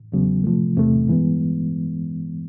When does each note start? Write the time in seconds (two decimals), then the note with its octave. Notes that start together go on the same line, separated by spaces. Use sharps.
0.12 E2 C#3 F#3 B3
0.44 C3 F3 A3
0.77 E2 C3 E3 A3
1.08 G2 E3 G#3 B3